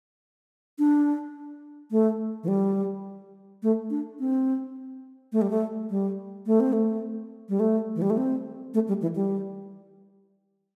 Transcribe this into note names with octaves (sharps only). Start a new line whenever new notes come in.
D4
A3
E3
G3
A3
D4
C4
A3
G3
A3
G3
A3
C4
A3
G3
A3
E3
G3
A3
C4
A3
G3
E3
G3